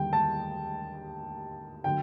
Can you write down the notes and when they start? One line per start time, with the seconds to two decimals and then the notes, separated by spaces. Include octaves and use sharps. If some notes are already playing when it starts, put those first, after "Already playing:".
Already playing: D#2 D3 G3 G5
0.13 A5
1.84 D3 F#3 G5